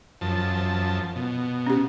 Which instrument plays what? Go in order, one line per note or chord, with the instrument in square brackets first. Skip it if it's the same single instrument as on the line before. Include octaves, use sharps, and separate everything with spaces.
[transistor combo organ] F#2 F3 A5
B2
[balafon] C#4 G4